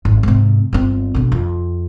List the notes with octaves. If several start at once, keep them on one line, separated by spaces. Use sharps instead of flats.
G#1
G#2 C3
G1 C4
B2 D3
F2